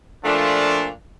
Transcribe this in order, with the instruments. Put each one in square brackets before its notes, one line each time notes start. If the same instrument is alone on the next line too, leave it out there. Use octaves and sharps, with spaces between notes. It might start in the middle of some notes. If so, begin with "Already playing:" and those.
[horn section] A#2 F3 A3 D4